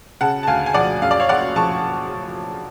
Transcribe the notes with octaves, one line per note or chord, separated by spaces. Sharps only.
C#3 F#5 A5
A5
D2 F5 G#5
G#5
F3 D5 F#5
F#2 F5
D5
C#5 F5
F#1 D5 F#5
F3 A5 C#6